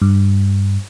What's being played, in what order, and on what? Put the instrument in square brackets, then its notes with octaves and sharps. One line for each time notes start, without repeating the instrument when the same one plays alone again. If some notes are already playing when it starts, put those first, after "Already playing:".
[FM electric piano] G2